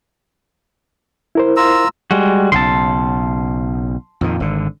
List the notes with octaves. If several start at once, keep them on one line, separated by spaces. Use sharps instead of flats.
E4 A#4 C5
F4 A#5 E6
G3 G#3 F#4
B1 C#3 A5 C6
F2 A#2 D#3
G#1 D3